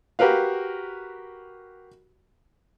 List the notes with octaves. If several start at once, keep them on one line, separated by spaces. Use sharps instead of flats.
F#4 G4 A#4 B4 F5